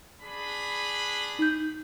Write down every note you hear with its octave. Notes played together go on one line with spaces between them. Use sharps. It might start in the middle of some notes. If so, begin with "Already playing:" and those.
D4 G#4 B5
D#4 G6